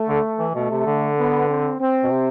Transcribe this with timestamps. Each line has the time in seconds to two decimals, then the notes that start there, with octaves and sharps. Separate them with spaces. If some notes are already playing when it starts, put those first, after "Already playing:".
Already playing: A3
0.08 D3
0.39 E3
0.54 B2 A3
0.71 C3
0.86 D3
1.17 B3
1.48 C4
1.79 C4
2.03 B2
2.10 C3